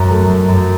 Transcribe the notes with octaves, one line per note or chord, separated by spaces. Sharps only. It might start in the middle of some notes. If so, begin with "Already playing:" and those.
Already playing: F#2 A#4
A3
F#2
F#2